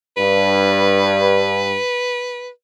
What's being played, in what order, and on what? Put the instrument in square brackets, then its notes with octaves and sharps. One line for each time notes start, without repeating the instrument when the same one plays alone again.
[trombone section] G2 [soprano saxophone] B4